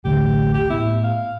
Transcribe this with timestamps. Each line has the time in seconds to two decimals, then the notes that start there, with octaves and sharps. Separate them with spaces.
0.05 A1 D2 D3 G4
0.54 G4
0.70 A2 B3 E4
1.04 F5